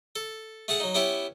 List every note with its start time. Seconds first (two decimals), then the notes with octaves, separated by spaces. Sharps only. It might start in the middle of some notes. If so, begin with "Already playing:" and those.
0.16 A4
0.68 A3 G#4 F#5 A5
0.80 F#3 D#4
0.95 B3 C#4 E4 G4 C#5 E5